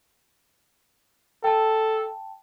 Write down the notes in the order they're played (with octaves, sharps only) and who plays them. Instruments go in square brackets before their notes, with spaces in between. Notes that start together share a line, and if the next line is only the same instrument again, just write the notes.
[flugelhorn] A4 [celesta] G5 A5